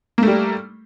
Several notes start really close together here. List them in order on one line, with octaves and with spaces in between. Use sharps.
A#3 A3 G3